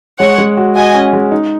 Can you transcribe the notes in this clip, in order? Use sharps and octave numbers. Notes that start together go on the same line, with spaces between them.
G#3 C#5 F#5
G#3
F#4
F#4 D#5 G#5
C#4
G#3
D#4